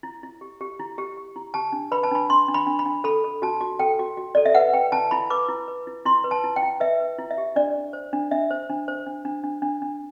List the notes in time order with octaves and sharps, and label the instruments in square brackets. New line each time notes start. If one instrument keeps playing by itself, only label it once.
[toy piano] E4
E4
G4
G4
E4
G4
G4
E4
G4 A5
D4
B4 B5
A5
D4 B5
D4 C6
D4
B5
D4
B5
D4
A4 B5
A4
F#4 A5
F#4
A4 G5
F#4
F#4
A4 D5
E5
B4 F#5
B4 G5
E4 A5
E4 B5
B4 D6
E4
B4
E4
E4 C6
B4
A5
E4
G5
E4
B4 E5
B4
E4
E5
G4
D4 D5
D4
C5
D4
D4 E5
C5
D4
C5
D4
D4
D4
D4
D4